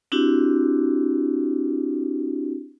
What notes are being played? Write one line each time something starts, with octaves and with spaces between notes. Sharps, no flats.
C4 D4 E4 F#4 G4